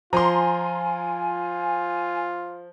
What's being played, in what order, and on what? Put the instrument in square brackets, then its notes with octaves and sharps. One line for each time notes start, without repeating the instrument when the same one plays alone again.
[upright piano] F3 [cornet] F4 [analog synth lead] G#5 [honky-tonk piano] A#5 C6